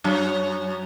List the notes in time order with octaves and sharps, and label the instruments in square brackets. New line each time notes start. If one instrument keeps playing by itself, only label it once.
[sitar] F#2 F#3